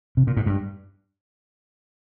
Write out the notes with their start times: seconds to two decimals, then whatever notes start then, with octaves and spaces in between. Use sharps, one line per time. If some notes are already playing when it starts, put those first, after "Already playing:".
0.17 C3
0.27 A#2
0.37 G#2
0.46 G2